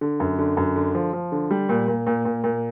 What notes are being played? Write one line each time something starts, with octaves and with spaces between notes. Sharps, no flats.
D3
F#2
D3
F#2
D3
F3
F3
D3
G3
A#2
A#2
A#2
A#2
A#2